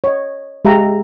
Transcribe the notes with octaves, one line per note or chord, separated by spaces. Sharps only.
C#5 D#5
G#3 G4 E5 F5 A#5